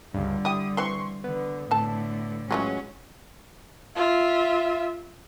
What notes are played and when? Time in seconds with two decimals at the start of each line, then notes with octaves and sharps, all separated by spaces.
0.14 C#2 G2 D3 G3
0.45 E4 G4 D#6
0.77 E3 C4 C6 C#6
1.24 D3 B3
1.71 A2 D3 C4 A4 A5
2.51 E3 F#3 G#3 C#4 F4 G4
3.97 F4 E5